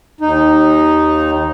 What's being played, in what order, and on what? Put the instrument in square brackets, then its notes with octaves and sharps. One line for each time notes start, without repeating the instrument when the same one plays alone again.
[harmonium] D#2 D#4